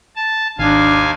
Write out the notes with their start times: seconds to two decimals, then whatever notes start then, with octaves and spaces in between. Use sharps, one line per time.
0.16 A5
0.59 G#1 D#2 D4 F5 G#5